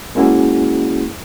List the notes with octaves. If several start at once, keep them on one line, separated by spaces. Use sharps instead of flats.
G#3 A#3 C#4 E4 F#4 G#4